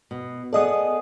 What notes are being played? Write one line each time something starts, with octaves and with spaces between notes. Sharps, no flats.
B2
B3 G#4 A4 D5 D#5 D#6